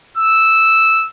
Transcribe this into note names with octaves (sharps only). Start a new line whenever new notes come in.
E6